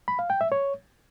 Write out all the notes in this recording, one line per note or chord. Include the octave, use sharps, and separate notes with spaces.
B5
F5
G5
E5
C#5